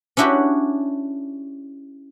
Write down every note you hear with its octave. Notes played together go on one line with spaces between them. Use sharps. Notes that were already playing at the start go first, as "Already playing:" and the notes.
C#4 D4 E4 F#4 G4